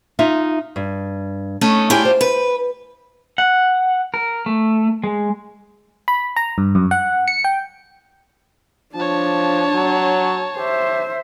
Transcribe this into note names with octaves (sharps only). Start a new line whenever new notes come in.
D#4 F4 E5
G2
A3 C#4 D#4
E4 F4 G4 C#5 D5 G#5
C5
B4
F#5
A#4
A3
G#3
B5
A#5
G2
F#2
F#5
C#7
G5
F3 D4 C#5 A5
F#3
G4 C5 E5